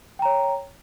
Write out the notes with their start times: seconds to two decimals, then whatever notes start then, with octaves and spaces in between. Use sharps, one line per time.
0.19 G5
0.22 A#5
0.25 C#5